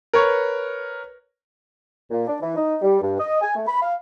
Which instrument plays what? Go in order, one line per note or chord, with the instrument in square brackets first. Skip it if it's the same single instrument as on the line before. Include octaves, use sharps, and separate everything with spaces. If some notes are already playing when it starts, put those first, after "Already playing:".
[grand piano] A#4 B4 C#5 C#6
[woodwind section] A#2
D4
E3
D#4
G3
G2
D#5
G#5
A3
B5
F5